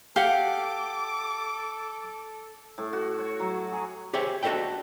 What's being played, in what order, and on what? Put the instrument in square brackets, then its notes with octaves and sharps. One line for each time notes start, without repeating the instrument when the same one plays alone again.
[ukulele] G4 F#5 [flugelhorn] A4 [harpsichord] F5 [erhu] D6
[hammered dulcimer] A2
F#4
C#5
F#3
G#4
[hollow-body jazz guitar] G4 G#4 C5 C#5 E5 G5
D4 F#4 A4 D#5 E5 G5